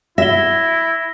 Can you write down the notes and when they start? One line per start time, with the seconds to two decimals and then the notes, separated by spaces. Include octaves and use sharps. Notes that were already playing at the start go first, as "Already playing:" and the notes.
0.18 E4 E5 A#6 G7